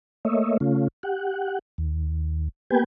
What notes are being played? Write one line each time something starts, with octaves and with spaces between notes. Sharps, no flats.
A3 A#3 C#5 D#5 E5
C#3 A3 C#4 F4
G4 F#5
D#2
A#3 B3 G4 B4 G5 G#5